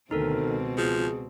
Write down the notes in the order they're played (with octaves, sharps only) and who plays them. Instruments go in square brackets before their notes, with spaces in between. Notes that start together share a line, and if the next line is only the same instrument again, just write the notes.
[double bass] D2 D#3 [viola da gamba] B2 C4 [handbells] D#4 A4 A#4
[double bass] C#2
[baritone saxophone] F3 [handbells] G#4